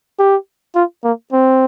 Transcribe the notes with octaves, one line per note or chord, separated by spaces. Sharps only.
G4
F4
A#3
C4